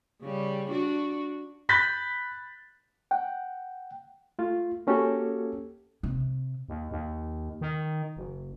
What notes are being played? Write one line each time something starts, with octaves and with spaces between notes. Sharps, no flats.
C#3 G3
D4 F#4
B5 F#6 G6 A6 B6
F#5 G5
A3 F4
A#3 C#4 F#4 G4 A4
C3
D#2
D#2
D#3
F#1